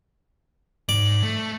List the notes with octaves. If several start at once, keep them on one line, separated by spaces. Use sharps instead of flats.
G#2 D5
A3